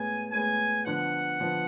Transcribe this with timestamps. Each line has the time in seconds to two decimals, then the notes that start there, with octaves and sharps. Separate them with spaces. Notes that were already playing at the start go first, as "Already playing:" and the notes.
Already playing: A2 G#3 B3 G#5
0.31 A2 G#3 B3 G#5
0.86 D3 F3 B3 F#5
1.40 D3 F3 B3